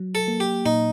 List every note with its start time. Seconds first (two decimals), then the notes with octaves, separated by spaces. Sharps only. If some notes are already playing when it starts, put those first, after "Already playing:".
Already playing: F#3
0.15 A4
0.28 A#3
0.40 G4
0.66 A#2 D#4